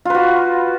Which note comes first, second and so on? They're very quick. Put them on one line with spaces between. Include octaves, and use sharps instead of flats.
F4 B4 F#4